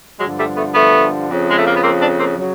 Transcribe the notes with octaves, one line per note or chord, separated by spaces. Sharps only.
G2 D3 F3 F#3 G#3
G3 A3
A3 B3
A3 B3
F2 C#3 F3
G#3
A3
A#3
B3
A#3 C4
C4 D4
A#3 C4
C#3 F#3